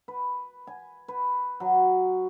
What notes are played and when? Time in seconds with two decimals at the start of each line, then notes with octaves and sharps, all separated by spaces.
0.08 B4
0.67 G#5
1.08 B4
1.60 F#3